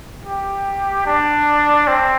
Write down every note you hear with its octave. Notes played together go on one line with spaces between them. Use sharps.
G4
D4
C4